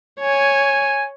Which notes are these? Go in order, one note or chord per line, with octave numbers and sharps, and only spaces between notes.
C#5 G#5